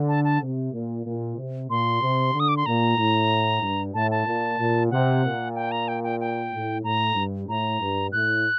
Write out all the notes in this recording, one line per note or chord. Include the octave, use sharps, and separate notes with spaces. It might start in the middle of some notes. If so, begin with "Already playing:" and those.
Already playing: D3
A5
A5
C3
A#2
A#2
C3
A#2 C6
C3
D3
D#6
D6
C6
A#2 A#5
A2
G2
A2 A5
A5
A#2
A#2
C3 F#5
A#2
G5
A#5
G5
G5
G5
A2
A2 A#5
G2
A2 A#5
G2
A2 F#6